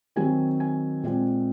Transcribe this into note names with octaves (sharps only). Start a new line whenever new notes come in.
D#3 F#3 C4 G#5
G#5
A#2 G#3 C4